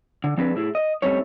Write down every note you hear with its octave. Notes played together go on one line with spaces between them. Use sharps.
D3
F3 C4 D4 G#4 B4
A2 E4 G4 G#4
D#5
G3 A3 C4 C#4 D#4 C#5